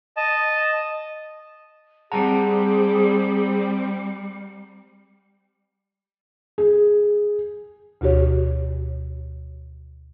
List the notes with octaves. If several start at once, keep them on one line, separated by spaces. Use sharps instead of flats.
D#5 A5
G3 C4 G#4 F#5 A5 A#5
G#4
D2 B2 F#4 G4 C#5